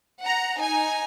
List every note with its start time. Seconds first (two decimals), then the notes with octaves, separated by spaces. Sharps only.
0.22 F#5 A#5
0.60 D#4 G#5